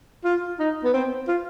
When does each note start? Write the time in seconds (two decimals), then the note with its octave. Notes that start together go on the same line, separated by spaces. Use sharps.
0.25 F4
0.59 D#4
0.84 B3
0.93 C4
1.28 F4